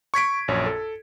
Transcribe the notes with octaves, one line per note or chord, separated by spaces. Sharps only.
C#6 G#6 B6 D7
A#1 F#2 C#5
A4